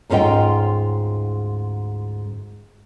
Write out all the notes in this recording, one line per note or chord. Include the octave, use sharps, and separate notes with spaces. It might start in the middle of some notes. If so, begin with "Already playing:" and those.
D2 G#2 C#4 F4 D#5 G5